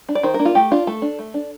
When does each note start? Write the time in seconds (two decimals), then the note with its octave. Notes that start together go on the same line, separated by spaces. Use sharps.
0.09 D4
0.15 D5
0.23 D#3 C5
0.34 A#4
0.39 A#3 D4
0.45 F4
0.55 A3 G4
0.71 D4 F4
0.87 A3 A4
1.02 D4
1.19 A3
1.34 D4